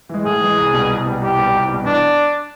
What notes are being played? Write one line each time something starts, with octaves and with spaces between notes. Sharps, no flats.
E3 G#3
A2 G#4
E3 G#3
C2
B2 G3
C2
B2 G3
C2 G4
B2 G3
C2
B2 G3
E2 D4